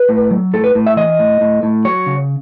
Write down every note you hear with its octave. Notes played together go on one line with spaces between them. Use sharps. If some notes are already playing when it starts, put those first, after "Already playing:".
Already playing: B4
A2
F#3
A2 A4
B4
A2
E5
E3 D#5
A2
A2
A2
F#3 C#5
C#3